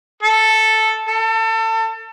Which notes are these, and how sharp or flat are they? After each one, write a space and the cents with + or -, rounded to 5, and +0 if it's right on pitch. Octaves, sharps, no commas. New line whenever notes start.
A4 +0
A4 +30